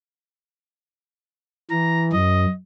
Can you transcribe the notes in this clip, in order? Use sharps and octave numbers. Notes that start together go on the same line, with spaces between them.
E3 A#5
F#2 D#5